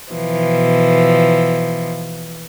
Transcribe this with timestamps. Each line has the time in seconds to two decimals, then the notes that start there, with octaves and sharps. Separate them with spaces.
0.12 B2 E3 F3